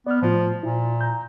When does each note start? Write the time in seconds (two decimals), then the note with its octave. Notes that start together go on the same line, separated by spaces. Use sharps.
0.07 B3 D5 F6
0.22 A2 F3 F4
0.63 A#2 E4
1.01 A#5 G6